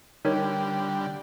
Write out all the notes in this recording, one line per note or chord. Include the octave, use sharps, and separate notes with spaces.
D3 G3 D#4 A#4 C#5